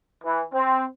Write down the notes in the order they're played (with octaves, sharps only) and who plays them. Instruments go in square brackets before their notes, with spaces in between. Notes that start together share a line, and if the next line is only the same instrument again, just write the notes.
[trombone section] E3
C4